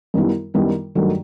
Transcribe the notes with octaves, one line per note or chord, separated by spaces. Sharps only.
F#2 D#3 G3 B3 E4
F#2 D#3 G3 B3 E4
G2 D#3 F#3 A3